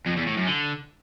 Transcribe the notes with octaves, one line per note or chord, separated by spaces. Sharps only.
F2
E2
A2
F#2
D3